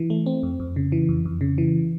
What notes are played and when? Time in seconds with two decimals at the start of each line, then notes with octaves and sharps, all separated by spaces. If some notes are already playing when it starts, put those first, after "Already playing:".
Already playing: E3
0.10 A3
0.26 C4
0.43 F2
0.60 F2
0.76 C#3
0.92 E3
1.09 F2
1.25 F2
1.41 C#3
1.58 E3